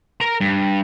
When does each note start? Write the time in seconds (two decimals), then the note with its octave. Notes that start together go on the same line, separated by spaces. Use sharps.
0.21 A#4 A#5
0.41 G2